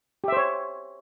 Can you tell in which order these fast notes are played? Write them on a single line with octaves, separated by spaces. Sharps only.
G4 E5 C5 C#5